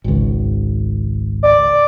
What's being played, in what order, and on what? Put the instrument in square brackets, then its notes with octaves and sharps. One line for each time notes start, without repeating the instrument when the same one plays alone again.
[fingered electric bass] G#1 C#2
[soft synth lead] D5